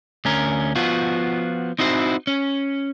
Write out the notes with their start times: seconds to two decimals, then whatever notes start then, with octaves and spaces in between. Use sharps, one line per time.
0.25 D2 C#4 A#4
0.76 F3 B3 F4 F#4
1.79 C4 D#4 E4 F#4 C5
2.27 C#4